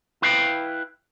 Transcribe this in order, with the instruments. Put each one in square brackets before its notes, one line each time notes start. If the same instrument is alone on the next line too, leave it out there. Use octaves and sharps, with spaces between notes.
[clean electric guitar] E4 B4 F5 G5